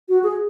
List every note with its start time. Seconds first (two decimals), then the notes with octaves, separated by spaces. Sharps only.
0.09 F#4
0.23 G#4